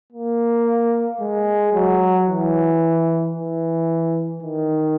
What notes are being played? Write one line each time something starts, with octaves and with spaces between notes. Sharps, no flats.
A#3
G#3
F#3
E3
E3
D#3